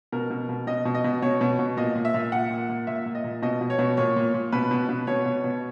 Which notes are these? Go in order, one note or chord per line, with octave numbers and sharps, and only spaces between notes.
B2 A#4
B2
B2
B2 D#5
B2
D#5
B2
B2 C#5
B2
B2
A#2 D#5
A#2
E5
A#2
A#2 F#5
A#2
A#2
A#2 E5
A#2
D#5
A#2
B2 D#5
B2
C#5
B2
A#2 C#5
A#2
A#2
B2 B4
B2
B2
B2 C#5
B2
B2